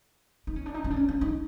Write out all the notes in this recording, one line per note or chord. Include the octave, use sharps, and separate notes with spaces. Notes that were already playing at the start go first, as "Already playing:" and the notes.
D#4
C#4
D4
D#4
C#4
D4
C#4
D4
D#4